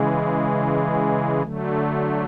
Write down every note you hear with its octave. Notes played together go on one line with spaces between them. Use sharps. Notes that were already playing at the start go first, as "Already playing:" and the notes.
Already playing: C#3 E3 G#3
D3 F#3 A3